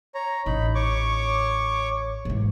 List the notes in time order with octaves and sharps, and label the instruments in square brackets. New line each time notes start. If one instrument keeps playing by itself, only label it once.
[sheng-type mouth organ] C#5 A#5
[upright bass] A1 [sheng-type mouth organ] D#4 B5
[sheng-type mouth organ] C#5 C#6 D6
[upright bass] G#2 E3